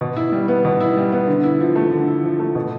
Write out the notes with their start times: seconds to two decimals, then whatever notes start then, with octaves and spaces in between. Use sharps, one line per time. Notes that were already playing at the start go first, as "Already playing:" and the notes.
0.01 B2
0.16 E4
0.32 G3
0.48 B3
0.65 B2
0.80 E4
0.97 G3
1.12 B3
1.27 D3
1.43 E4
1.60 F3
1.76 A3
1.91 D3
2.08 E4
2.23 F3
2.40 A3
2.55 B2